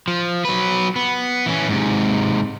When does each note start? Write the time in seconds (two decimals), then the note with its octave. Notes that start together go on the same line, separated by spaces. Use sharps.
0.08 F3
0.45 F#3 B4
0.96 B3
1.46 E3 C#4
1.69 G#2 C3